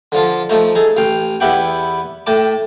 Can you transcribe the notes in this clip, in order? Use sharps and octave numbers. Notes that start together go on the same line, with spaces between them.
D3 F3 F4
F3 A3 D#4
D#4 G#4 A4
A1 F5 G5
E2 B3 E4 G4 F#5 G5
A2 G5 A5 D6